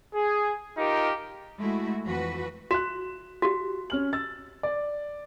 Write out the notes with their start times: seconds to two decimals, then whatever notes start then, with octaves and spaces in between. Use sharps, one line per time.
0.14 G#4
0.77 D#4 F4 G4 A#4
1.58 G#3 A3 E4 F#4
2.06 F2 E3 F#4 B4
2.71 F#4 F#6 E7
3.42 F#4 G4
3.90 C#4 F6 F#7
4.13 E6 A6
4.63 D5